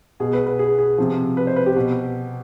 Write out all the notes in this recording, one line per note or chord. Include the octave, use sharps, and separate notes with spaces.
B2 G#4
B4
B4
G#4
G#4
C3 F3
B4
C5
B4
G4
B2